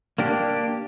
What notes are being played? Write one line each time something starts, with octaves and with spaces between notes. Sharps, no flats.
A#3 D4 G4